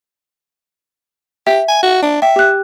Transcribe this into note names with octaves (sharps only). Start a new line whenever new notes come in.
G4 E5
G#5
F#4
D4
E5 G5
G4 F#6